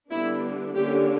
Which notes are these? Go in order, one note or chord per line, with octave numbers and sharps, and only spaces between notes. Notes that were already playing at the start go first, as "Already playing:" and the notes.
D3 G3 B3 D4 E4
D3 A#3 C#4 G4